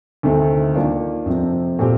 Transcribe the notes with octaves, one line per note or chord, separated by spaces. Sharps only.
D2 C3 D#3 A3 C4
D#3 A#3 D4 F4
F2 C3 F3 C4
A#2 A3 C4 G4